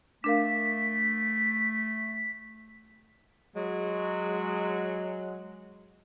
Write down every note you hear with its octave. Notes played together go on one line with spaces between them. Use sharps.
A3 D4 A#4 F5 B6
F#3 G#3